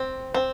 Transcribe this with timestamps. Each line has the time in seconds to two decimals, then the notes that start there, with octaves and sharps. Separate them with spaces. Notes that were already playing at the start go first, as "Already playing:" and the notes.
Already playing: C4
0.34 C4